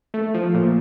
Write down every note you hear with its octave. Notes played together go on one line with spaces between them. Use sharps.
A3
F3
A#2